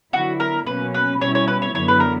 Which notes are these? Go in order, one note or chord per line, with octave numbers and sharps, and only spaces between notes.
D3 F#3 B3 E4 F#4
A#4
B2 F#3 A#3 C#4 B4
B4
B2 G3 C#4 E4 C#5
C#5
B4
C#5
F#2 D3 F#3 B3 E4 C#5
B4
A#4